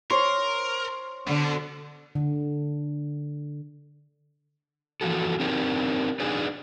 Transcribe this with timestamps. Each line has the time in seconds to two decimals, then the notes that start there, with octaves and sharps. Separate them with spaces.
0.11 A#4 C5 C#5 C6
1.28 B2 D3
2.15 D3
5.01 E3 F3 A#3 F#4 A4
5.40 C4 D4 D#4 G4 A#4 B4
6.19 D4 D#4 G#4 B4 D5 G#5